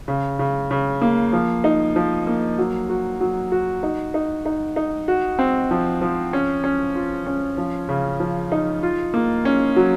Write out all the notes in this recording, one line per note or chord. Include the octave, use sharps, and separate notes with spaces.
C#3
C#3
C#3
A#3
F3
D#4
F3
A#3
F#3
F#4
F#3
F#4
D#4
D#4
D#4
D#4
F#4
C4
F3
F3
C#4
C#4
F4
C#4
F3
C#3
F3
D#4
F4
A#3
C#4
F#3